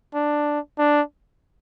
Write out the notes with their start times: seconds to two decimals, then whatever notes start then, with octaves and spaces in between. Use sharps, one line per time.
0.15 D4
0.79 D4